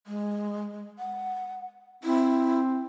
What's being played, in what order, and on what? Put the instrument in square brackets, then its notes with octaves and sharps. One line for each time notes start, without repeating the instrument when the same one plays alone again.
[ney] G#3
F#5
[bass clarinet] C4 [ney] E4